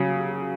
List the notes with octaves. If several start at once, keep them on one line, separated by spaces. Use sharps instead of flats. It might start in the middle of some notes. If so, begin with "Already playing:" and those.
Already playing: C#3 F#3